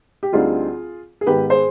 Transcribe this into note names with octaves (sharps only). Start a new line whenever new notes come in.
G4
D2 D3 G3 C4 D#4 F4 G#4
G#4
G#2 D#3 B3 G4 B4
G#4 C5